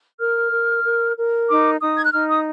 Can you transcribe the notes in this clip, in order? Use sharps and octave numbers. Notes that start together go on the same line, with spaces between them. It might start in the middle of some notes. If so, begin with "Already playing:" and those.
A#4 F6
A#4
A#4
A#4
D#4 D6
D#4 D#6
G#6
F#6
D#4 F6
D#6